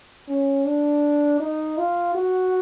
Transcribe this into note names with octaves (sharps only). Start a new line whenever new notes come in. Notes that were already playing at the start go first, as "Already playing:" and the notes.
C#4
D4
D#4
F4
F#4